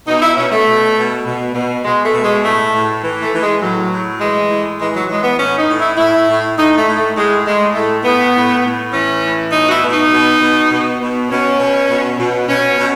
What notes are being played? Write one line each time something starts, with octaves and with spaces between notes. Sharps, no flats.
B2 D#4
E4
B2 C#4
A3
B2
B2
B2
B2
B2 G#3
A3
B2
G#3
A2 A3
A2
E3
A3
E3
G#3
A2 F#3
A2
E3 G#3
A2
E3 G#3
F#3
E3 G#3
B3
A2 C#4
D#4
A2
E4
A2 E4
A2
A2 D#4
A3
A2
A3
A2 G#3
A2 G#3
A2 A3
A2 B3
A2
A2
E3 C#4
A2
B2 D#4
F#4
E4
B2
D#4
B2
B2
B2
B2
B2 C#4
B2
B2
B2
B2 C#4
B2